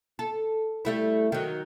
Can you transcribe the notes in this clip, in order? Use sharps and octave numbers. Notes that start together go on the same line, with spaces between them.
A4
G3 A3 E4
D#3 F#3